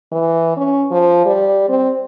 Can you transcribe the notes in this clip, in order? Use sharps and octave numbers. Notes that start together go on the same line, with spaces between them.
E3
C#4
F3
G3
C4